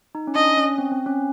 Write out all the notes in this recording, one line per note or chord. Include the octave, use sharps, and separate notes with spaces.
D#4
C#4
D4 D#5
C#4
C4
C4
C#4